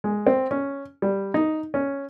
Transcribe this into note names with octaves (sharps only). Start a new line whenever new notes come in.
G#3
C4
C#4
G3
D#4
C#4